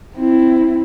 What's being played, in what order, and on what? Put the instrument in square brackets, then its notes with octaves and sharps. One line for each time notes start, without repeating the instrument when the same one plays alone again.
[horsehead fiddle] C4 E4